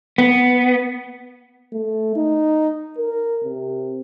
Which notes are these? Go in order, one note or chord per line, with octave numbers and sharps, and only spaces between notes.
B3
A3
D#4
A#4
C3